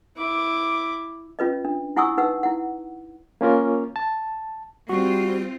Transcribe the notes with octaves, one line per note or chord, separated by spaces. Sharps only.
E4 D6
C#4 F4 B4 D#5
D4
E4 F#5 G#5 C#6 D#6 E6
D#4 B4 F#5 E6
E4 F#5
A#3 C#4 F4 A#4
A5
G3 C4 F4 F#4